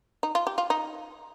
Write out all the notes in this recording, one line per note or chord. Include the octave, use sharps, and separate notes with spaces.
D#4
F4
G4
F4
D#4